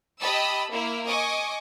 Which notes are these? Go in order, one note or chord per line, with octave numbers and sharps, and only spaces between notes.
G4 D#5 A5 B5 E6
A#3 E4
D#5 G#5 C#6 D6